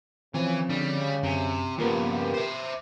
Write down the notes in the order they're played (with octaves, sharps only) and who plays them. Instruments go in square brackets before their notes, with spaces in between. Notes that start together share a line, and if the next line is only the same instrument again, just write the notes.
[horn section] C#3 [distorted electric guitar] E3 G#5 [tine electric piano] F3 C4
[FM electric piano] D3 [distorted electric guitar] G3
[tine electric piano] F#2 G#5 [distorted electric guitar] C3
[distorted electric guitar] G2 C#3 [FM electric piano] F3 A#3 B3 [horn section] G4 [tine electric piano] B5 C6
[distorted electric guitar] C5 E5